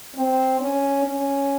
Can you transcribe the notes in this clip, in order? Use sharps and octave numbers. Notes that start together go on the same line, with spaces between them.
C4
C#4
C#4